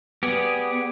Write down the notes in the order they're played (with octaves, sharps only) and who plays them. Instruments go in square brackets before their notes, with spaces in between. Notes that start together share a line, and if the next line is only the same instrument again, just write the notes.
[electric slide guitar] B3 [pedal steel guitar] G4 G#4 D5